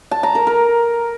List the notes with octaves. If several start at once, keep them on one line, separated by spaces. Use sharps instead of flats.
A5
A#5
A#4
A#4